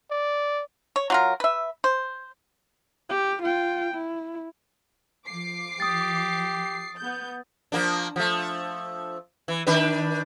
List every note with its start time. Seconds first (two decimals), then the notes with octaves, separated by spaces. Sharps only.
0.11 D5
0.96 C#5
1.10 F#3 F4 A#4
1.40 B4 E5
1.84 C5
3.09 G4
3.43 F4 G5
3.94 E4
5.27 F3 D6 C7
5.80 G4 D#6 A6
6.98 B3 G6
7.72 F3 A#3 D4
8.16 F3 A3
9.48 E3
9.67 D#3 D4 B4